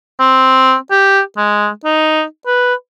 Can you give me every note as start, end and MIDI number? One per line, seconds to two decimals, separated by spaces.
0.20 0.74 60
0.91 1.21 67
1.37 1.69 56
1.85 2.23 63
2.47 2.74 71